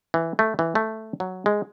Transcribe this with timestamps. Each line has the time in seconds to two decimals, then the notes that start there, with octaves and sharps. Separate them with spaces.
0.14 E3
0.39 A3
0.59 E3
0.75 A3
1.20 F#3
1.46 G#3